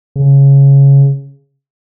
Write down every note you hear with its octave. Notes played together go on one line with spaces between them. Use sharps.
C#3